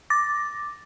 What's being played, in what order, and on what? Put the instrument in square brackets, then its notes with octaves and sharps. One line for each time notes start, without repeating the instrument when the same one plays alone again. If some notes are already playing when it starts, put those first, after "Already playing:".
[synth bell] D6 A6 A#6